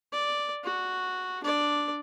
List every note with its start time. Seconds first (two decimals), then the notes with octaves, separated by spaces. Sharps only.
0.12 D5
0.64 F#4
1.43 D4 D5